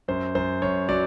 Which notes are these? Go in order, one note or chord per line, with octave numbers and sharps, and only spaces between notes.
F#2 C5
F#2 C5
F#2 C#5
F#3 D5